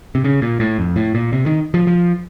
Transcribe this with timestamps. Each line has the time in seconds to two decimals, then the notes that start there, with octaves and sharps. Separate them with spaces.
0.15 C3
0.24 C#3
0.42 A#2
0.60 A2
0.79 F2
0.96 A2
1.15 A#2
1.33 C3
1.46 D#3
1.74 F3
1.87 F3